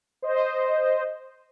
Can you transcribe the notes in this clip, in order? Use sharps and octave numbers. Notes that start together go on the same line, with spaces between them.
C5 D#5